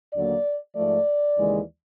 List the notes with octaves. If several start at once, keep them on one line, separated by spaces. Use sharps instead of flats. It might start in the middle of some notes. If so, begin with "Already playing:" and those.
D#2 D3 F#3 A#3 D5
G#2 F3 A3 D5
D#2 C#3 E3 G#3